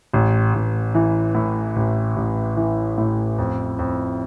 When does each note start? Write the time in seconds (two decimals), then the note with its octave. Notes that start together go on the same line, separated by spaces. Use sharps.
0.13 A1
0.55 A1
0.95 E3
1.35 A2
1.76 A1
2.16 A1
2.57 E3
2.98 A2
3.38 F2
3.79 F2